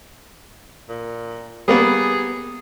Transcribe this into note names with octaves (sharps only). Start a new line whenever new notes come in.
A#2
G3 A#3 B3 G#4